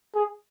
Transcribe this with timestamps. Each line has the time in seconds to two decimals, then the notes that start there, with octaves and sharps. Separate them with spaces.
0.15 G#4